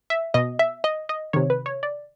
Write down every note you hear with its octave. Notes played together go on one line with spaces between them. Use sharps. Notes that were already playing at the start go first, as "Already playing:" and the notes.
E5
B2 D#5
E5
D#5
D#5
C3 D#3 C#5
B4
C#5
D5